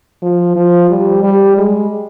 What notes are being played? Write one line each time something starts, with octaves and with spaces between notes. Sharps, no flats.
F3
F3
G3
G3
G#3